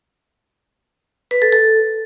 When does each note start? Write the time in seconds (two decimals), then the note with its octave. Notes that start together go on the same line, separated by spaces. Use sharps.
1.31 B4
1.42 A4
1.52 A4